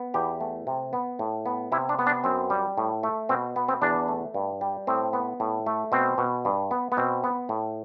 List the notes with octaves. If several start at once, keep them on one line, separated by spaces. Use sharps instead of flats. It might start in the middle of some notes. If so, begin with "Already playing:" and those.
Already playing: B3
E2 G4
A3
C3
B3
A2
B3
C3 E4
D4
B3
D4
F#2 C4
G3
A2
A3
B2 C4
B3
C4
E2 D4
A3
G2
G3
A2 C4
B3
A2
A3
B2 C4
B2
G2
B3
B3
B2 C4
B3
A2